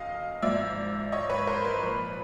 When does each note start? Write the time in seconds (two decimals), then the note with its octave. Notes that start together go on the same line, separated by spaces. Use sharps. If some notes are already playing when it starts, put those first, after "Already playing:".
Already playing: G1 F#2 D#5 F5
0.42 G#1 G#2 F3 D5 E5
1.12 C#5 D#5
1.30 B4 C#5
1.47 A#4 C5
1.65 B4
1.82 A#1 A#2 F3